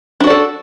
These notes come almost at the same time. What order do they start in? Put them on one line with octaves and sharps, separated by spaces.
D4 F#4 D5 A4